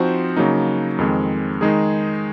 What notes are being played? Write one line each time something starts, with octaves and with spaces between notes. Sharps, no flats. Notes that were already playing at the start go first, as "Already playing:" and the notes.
Already playing: F3 C4 D#4 F#4 C5
C#3 F#3 A#3 D#4
F2 D#3 G#3 C4
D#3 G#3 D#4 G#4